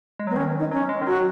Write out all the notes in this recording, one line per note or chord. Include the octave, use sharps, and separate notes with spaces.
G#3
F#3 B3
D#3 C#4
D#4
F#3 C#4
G#3
D#3
F#3 F#4